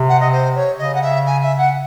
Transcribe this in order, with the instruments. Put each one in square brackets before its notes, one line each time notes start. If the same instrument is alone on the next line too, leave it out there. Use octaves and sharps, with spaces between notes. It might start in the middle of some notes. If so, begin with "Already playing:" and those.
Already playing: [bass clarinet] C3
[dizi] F#5
D#5
C5
C#5
[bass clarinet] C#3 [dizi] D#5
[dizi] F#5
E5
G#5
E5
F#5